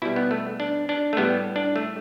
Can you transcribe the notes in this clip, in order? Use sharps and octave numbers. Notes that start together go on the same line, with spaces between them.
B2 G3 E4
B3
A3
D4
D4
A3
A2 G3 B3
D4
A3